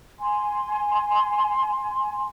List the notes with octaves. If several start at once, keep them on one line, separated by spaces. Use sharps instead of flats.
G#5 C6